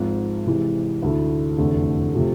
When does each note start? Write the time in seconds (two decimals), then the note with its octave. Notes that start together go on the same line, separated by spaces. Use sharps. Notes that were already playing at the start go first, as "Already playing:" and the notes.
Already playing: G#1 G#2 F3
0.46 C3 E3 G#3
1.02 D2 D3 A3 E4
1.58 F1 E2 D3 A3
2.14 C3 F3 A3